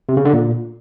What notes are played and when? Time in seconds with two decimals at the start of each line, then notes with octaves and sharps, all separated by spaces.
0.09 C3
0.17 C#3
0.25 D3
0.33 A#2